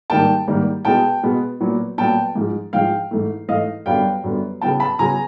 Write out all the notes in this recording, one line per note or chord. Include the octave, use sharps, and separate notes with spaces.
G#2 D#3 G3 A#3 G5 A5
G#2 D#3 G3 A#3
B2 G#3 B3 G5 A5
B2 G#3 B3
A#2 F#3 B3
A#2 F#3 B3 G5 A5
G#2 F3 G#3
G#2 F3 G#3 F5 G5
G#2 E3 A3
G#2 E3 A3 D#5 F5
F#2 D3 G3 B3 F5 G5
F#2 D3 G3 B3
C#3 F#3 B3 G5 A5
A5 B5
C#3 F#3 B3 G#5 A#5